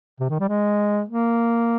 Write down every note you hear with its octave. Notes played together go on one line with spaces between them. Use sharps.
C3
D#3
G3
G#3
A#3